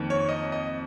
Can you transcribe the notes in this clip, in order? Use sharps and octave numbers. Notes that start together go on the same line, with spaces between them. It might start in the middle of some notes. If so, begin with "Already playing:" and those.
Already playing: F2 D#3 A#3
C#5
D#5
D#5